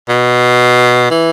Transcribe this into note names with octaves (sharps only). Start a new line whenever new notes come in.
B2
E3